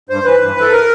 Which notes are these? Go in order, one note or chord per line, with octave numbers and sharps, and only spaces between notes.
G2 C5
E3 B4
G2
E3 A4
A#4